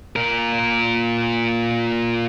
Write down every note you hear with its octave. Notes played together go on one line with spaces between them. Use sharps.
A#2 A#4